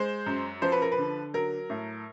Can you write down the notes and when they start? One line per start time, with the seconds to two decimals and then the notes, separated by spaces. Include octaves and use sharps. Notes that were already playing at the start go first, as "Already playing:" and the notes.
Already playing: G#3 C5
0.26 F#2
0.62 F3 C5
0.72 B4
0.82 A#4
0.92 B4
0.98 D3
1.34 F#3 A#4
1.70 A2